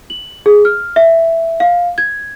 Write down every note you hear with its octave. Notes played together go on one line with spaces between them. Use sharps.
F#7
G#4
F6
E5
F5
G#6